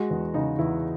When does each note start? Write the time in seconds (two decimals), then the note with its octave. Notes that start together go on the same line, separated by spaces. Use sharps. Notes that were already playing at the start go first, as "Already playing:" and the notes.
Already playing: G#3 F#4
0.10 E2
0.34 C#3 D#4
0.59 E2 E4